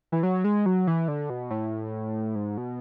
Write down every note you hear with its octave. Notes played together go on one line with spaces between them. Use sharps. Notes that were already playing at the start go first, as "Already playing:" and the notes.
E3
F#3
G#3
F#3
E3
D3
B2
A2
G#2
B2